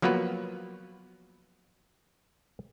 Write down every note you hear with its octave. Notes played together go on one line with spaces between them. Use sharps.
F3 F#3 A#3 B3 B4